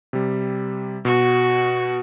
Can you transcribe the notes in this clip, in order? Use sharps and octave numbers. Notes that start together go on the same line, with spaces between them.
C3 G3
B2 F#4